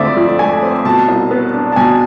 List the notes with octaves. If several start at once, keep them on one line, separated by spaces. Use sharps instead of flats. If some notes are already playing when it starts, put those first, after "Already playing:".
Already playing: F2 D3 A3 C4 D5 E5
F2
A3 G#5
C4
B2 A5
C2
B3
D4
A5
B2 G#5